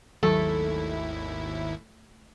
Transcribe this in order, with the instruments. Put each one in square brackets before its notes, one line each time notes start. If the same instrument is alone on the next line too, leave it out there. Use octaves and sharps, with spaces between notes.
[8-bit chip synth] G#1 D#2 E4 [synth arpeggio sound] D#3 F#3 [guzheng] A3 [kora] A4